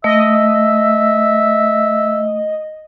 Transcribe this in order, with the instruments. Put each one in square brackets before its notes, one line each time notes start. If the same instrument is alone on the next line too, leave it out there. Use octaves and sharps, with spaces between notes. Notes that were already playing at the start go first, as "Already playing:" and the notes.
[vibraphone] A3 [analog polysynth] D#5 [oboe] E5